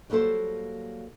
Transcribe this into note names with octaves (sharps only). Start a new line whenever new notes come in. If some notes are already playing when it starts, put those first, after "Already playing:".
F#3 G3 A#3 A4 C5